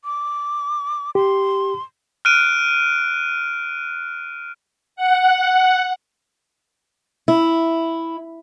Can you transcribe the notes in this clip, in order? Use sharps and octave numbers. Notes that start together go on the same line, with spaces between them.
D6
G4 C6
F6 F#6 D7 D#7
F#5
E4